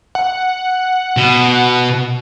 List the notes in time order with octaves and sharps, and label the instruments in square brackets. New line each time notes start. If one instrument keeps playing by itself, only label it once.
[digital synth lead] F#5
[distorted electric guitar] B2